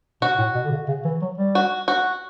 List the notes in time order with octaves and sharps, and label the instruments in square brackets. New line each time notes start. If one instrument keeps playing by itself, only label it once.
[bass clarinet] B2 [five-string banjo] F#4
[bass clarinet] A2
B2
D3
C#3
C#3
E3
F#3
G3
[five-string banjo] F#4
F#4